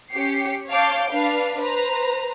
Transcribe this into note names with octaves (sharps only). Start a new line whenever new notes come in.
C#4 G4 C7 C#7
C#5 F5 A5 D6 G6
D4 B4 F5
B4 C5 A#5